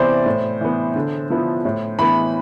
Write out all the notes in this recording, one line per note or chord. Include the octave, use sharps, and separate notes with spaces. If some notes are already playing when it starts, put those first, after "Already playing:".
Already playing: C3 E3 B3 C5 D5
A2
E3 B3
D3
F3 B3 E4
A2
E3 B3 B5